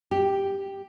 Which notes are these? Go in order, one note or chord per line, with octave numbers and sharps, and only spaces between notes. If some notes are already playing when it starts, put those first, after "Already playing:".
G4